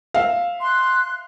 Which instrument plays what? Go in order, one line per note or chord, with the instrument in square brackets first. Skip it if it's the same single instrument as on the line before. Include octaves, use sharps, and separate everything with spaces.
[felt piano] E5 F5
[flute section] C6 F#6